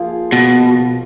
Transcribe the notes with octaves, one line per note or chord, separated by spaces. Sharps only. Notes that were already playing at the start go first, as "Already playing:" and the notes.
Already playing: F3 A#3 F4 G#4
B2